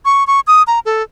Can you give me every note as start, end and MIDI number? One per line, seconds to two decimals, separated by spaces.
0.05 0.26 85
0.27 0.40 85
0.47 0.63 87
0.67 0.79 82
0.86 1.03 69